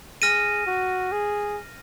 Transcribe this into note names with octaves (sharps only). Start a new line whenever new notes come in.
G#4 F6 A#6 D#7
F#4
G#4